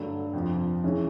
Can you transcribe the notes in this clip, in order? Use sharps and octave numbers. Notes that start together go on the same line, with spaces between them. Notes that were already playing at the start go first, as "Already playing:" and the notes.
Already playing: G2 D3 F#3 A3
F2 C3 F3
C#3 E3 G#3 C#4